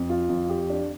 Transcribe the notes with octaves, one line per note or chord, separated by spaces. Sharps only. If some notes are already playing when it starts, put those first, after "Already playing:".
Already playing: F2
F4
F2
G4
D4